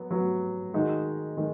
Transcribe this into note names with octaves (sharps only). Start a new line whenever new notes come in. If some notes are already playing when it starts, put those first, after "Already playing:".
Already playing: F#3 B3
F#3 B3 F#4
D#3 G#3 D#4 F#4
D#3 G#3